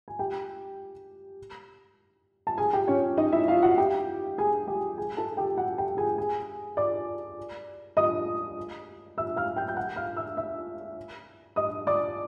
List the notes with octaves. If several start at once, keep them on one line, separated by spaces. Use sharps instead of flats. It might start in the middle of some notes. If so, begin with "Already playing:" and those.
G#5
G4 G5
A5
G#4 G#5
G4 G5
C#4 C#5
D#4 D#5
E4 E5
F4 F5
F#4 F#5
G4 G5
G#4 G#5
G4 G5
G#4 G#5
A4 A5
G4 G5
F#4 F#5
G4 G5
G#4 G#5
G#4 G#5
D5 D6
D#5 D#6
E5 E6
F5 F6
G5 G6
G6
F#5 F#6
F5 F6
E5 E6
E5 E6
D#5 D#6
D5 D6